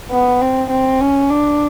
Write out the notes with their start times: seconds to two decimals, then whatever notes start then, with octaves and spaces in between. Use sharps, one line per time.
0.11 B3
0.41 C4
0.70 C4
1.01 C#4
1.30 D4